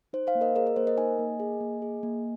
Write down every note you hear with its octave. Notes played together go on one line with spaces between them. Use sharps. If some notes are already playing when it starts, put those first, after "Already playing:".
D#4 C5
C5 F5
A#3
A#4 D#5
G#4 A#4 D#5
A#4
A#3 C5
A#4 D#5
D#4 D#5 G#5
A#3
G#4
A#3
G#4
A#3